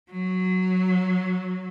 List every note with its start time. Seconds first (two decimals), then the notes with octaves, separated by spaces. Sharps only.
0.11 F#3